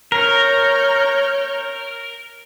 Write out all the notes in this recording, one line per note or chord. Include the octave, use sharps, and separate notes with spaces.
A#4 C#5 F6 G6